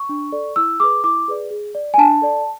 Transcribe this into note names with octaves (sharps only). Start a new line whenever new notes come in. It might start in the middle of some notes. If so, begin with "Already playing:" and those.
Already playing: C#6
D4
A4 D5
E4 E6
G#4 B4 D6
E4 D6
G#4 B4 D5
G#4
D5
G#5
D4 A5
A4 D5